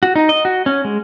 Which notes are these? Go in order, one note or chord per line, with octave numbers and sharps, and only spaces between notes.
F#4
D#4
D#5
F#4
C#4
G#3